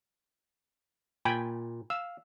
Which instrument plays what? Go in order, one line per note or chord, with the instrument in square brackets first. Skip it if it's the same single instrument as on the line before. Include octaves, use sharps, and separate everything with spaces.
[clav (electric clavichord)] A#2 [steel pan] G5 G#5 B5
[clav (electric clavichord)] F5 [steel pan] E6